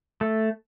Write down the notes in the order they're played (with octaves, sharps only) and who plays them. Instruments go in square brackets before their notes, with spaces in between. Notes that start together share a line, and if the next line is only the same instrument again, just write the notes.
[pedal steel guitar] A3